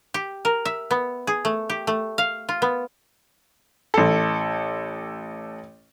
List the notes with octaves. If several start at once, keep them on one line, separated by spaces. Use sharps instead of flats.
G4
A#4
E5
B3
G#4
A3
G4
A3
F5
F4
B3
A1 A4